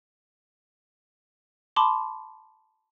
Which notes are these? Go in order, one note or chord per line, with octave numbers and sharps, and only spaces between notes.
A5 B5 C6 D6 D#6